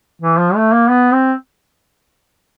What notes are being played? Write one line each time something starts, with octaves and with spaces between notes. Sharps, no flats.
E3
F3
A3
A#3
B3
C4